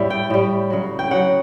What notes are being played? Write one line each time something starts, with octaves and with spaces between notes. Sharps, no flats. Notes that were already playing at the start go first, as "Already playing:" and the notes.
Already playing: A2 G3 E5
G5
A2 G3
C#3 F#3
G5
C#3 F#3 F#5